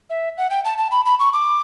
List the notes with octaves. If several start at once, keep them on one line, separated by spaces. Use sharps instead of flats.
E5
F#5
G5
A5
A5
B5
B5
C#6
D6